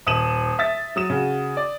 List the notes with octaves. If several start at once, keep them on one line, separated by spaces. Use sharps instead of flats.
D#1 D#6 D#7 E7 F#7
E5 A6
F#3 D#6 E7
C#3 F#4
D5